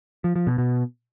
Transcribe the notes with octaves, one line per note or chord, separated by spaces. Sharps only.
F3
F3
B2
B2